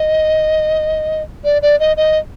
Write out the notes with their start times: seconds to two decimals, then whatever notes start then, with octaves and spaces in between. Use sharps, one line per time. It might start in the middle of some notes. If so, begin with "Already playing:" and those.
Already playing: D#5
1.44 D5
1.62 D5
1.80 D#5
1.97 D#5